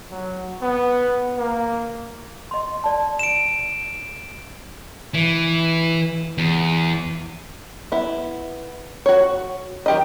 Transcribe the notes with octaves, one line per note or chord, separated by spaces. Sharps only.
F#3
B3
A#3
D#5 C6
D5 A5
D7 E7
E3
E2
B3 E4
F#4 C#5
D#3 G4 D#5